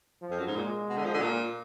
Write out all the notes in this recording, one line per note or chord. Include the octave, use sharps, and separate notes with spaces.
F3
F2
F#2
G#2
A#2 G#3
B2
D3
F3
D3
A#2